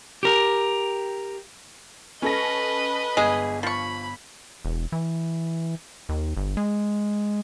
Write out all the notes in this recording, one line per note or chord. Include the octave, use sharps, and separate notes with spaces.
G4 A#4
C#4 A4 B4 D#5 A#6
G1 G#3 G#4
F3 B5 C#6
E1
E3
D#2
G1
G#3